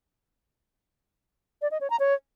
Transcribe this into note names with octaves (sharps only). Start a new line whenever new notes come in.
D5
D#5
C#5
A#5
C#5